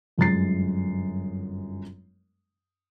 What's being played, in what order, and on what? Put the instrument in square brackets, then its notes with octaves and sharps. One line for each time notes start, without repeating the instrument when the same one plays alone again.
[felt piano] G1 F#2 G#3 A6 C7